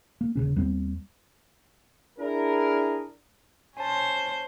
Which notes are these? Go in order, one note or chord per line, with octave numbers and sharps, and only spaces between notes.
A#3
D#1 C2 C#3 C#4
D#2 G3 B3 C4
D4 E4 G#4 A#4
C#4 C5 G#5 A5